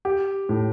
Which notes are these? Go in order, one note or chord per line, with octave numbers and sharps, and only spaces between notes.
G4
A2